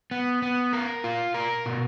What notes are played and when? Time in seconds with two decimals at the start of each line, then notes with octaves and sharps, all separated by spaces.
0.11 B3
0.42 B3
0.73 A#4
1.04 F4
1.34 A#4
1.66 B2